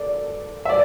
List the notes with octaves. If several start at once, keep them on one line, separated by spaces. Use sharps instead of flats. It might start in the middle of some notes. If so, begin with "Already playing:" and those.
Already playing: A4 D5
E5
D5